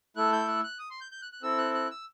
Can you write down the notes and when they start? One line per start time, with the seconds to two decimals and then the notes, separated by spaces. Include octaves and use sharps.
0.16 A3 E4 A4 F#6
0.33 G6
0.48 F#6
0.64 F#6
0.79 D#6
0.90 C6
1.01 G6
1.12 G6
1.22 F#6
1.32 F#6
1.43 C4 E4 A4 E6
1.58 F#6
1.74 F#6
1.91 E6